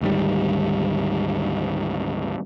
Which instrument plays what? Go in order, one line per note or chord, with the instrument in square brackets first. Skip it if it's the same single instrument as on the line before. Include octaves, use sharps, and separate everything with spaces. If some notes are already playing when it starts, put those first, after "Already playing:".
[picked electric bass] D2 G#2 D#3 G3